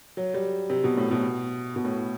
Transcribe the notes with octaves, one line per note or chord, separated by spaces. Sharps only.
F#3
G3
C3
B2
A2
B2
B2
A2